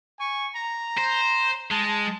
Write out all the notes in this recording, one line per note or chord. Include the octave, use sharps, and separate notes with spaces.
G#5 C#6
A#5
C5
G#3 A5